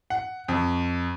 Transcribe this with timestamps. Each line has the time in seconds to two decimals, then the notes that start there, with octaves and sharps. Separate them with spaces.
0.10 F#5
0.48 F2